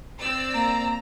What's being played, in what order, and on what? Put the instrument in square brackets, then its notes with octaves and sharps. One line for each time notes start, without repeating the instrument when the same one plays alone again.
[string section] C4 D5 E6
[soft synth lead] A#3 [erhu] A#5